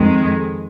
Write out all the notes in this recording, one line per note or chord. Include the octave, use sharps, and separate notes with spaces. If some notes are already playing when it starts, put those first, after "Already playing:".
Already playing: F2 D#3 G#3